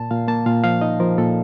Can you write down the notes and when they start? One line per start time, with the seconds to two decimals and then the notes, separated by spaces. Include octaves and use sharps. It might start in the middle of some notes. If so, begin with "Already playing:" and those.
Already playing: A#2 A5
0.10 A#2 F5
0.28 A#3 A5
0.46 A#2 F5
0.64 F3 F5
0.81 D#4 D#5
1.00 F3 A#4
1.18 A#2 A4